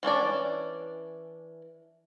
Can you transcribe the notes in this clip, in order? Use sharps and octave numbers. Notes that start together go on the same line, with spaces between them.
E3 C#4 D4 D5